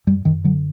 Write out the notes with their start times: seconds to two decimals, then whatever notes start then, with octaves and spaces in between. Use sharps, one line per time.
0.07 F#2 G3
0.25 F#2 D#3
0.44 D3 F#3